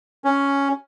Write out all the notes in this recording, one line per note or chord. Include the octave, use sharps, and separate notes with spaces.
C#4